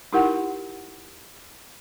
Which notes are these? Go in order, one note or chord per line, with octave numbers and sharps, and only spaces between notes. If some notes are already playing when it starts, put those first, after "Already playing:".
D#4 E4 G4 A#4 F#5